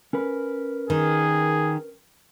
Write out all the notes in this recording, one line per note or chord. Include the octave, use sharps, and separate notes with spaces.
C#4 A#4 B4
D#3 G#4